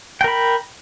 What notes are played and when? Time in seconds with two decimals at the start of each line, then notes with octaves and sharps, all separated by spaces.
0.21 G5
0.24 A#4
0.28 B5